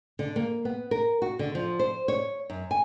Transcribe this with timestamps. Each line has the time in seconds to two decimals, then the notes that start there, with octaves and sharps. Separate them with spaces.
0.19 D3
0.36 A#3
0.65 B3
0.91 A#4
1.22 F#4
1.39 D3
1.55 F3
1.79 C5
2.08 C#5
2.50 F#2
2.71 G#5